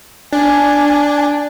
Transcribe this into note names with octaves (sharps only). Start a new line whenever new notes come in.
D4 G#5